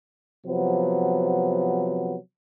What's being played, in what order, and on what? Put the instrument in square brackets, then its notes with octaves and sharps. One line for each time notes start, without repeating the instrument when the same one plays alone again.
[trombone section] C3 F3 F#3 B3